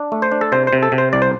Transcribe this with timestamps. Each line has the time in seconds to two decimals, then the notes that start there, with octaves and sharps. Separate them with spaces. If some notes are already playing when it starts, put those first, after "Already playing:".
Already playing: D4
0.12 A3
0.22 C5
0.32 D4
0.41 A4
0.52 C3 C5
0.67 C5
0.73 C3
0.83 A4
0.92 C3
0.98 C5
1.13 C2 D5
1.22 C5